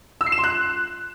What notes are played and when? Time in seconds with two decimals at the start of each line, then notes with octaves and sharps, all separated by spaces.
0.21 E6
0.26 C7
0.32 E7
0.38 C6
0.44 F#6